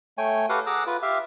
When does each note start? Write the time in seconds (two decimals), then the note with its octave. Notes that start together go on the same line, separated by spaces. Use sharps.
0.18 A3 C#5 G5 G#5
0.49 F#4 G4 A4 B4 F5 F#5
0.66 G#4 F#5 A#5 D6 E6
0.87 F4 B4
1.02 G4 E5 F5